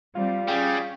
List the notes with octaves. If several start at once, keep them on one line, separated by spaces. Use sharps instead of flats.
G3 C4 F4
G3 C#4 G#4 G5